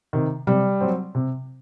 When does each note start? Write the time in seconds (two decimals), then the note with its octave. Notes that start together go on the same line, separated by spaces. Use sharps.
0.13 C3 D#3
0.47 C3 G3
0.81 F#3 C4
1.15 C3